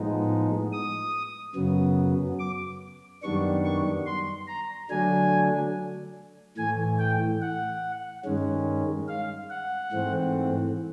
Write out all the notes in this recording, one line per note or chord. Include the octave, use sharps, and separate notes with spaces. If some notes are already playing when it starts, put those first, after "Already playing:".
Already playing: A2 F3 G#3 B3 D#4
D#6
F#2 C#3 F#3 B3
D6
F#2 D#3 G3 B3 D4 C#6
C#6
C6
A#5
D3 F#3 A3 D4 G#5
A2 E3 A3 G#5
G5
F#5
G2 D#3 G#3 C#4
F5
F#5
G#2 E3 A3 C4